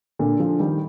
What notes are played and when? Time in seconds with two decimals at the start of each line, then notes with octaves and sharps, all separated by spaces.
0.19 A#2 D3
0.40 D3 F3
0.60 D#3 G3